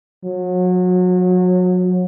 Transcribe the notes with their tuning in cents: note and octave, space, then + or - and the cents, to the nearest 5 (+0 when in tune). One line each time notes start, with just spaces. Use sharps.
F#3 -30